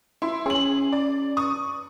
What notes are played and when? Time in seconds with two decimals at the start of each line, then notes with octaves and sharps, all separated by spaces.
0.22 E4 C6
0.46 C#4 G#4 F#7
0.93 D5
1.37 C#6 D#6